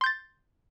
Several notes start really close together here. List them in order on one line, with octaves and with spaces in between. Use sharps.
C6 G6 A6